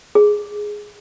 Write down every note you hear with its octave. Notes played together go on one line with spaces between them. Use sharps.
G#4